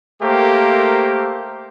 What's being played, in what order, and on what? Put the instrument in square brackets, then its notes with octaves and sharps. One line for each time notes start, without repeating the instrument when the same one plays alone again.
[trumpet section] A3 A#3 G4 A#4 C5